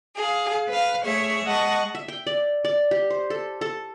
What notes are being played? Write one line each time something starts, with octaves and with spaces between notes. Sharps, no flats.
G#4 F5
B4 F5
A3 G#4 C#5 E5
G#3 D#5 F#5 A5 C#6
E5
G5
D5
D5
G4
C5
A4
A4